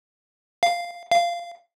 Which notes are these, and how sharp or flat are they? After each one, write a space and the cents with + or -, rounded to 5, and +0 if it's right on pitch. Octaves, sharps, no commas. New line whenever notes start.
F5 -5
F5 -15